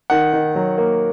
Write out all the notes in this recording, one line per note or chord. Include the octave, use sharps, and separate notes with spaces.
D#3 F#5
D#3
F#3
A#3